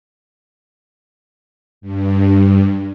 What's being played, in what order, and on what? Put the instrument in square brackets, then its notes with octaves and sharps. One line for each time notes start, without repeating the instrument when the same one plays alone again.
[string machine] G2